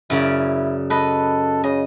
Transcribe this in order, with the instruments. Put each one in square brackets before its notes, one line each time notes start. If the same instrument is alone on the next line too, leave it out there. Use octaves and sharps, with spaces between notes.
[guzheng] F#2 C#3 D5 [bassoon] E4
[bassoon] A4 [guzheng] B4 D#5
[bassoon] C#3 [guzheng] D#5